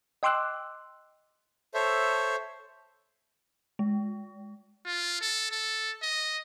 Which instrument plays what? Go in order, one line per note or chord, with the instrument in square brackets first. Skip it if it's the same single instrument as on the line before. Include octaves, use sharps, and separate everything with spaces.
[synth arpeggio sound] D#5 G5 C6 D6 E6 F#6
[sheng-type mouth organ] A4 C5 C#5 E5
[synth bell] G#3
[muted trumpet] F4
A4
A4
D#5